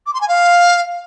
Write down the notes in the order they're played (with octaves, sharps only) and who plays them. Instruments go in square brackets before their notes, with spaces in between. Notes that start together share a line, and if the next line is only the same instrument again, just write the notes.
[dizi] D6
C6
G#5
F5